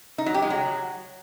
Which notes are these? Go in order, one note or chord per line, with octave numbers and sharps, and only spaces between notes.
D#4
F#3
G4
G#3
F#3